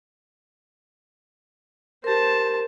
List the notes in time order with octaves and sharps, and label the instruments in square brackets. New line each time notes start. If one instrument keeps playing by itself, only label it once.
[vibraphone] G4 A#4 [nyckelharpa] C5 A5